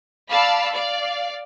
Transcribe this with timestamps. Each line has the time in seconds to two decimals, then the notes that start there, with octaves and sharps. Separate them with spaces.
0.30 D5 F5 A5 B5 E6
0.72 D5 F5